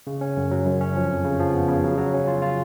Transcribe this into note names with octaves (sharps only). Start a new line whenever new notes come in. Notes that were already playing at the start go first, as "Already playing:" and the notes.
C#3
C#4
F#2
F#3
F#2
C#4
F3
F2
C#3
F3
B3
C#3
F#3
F#3
C#4
F4
F4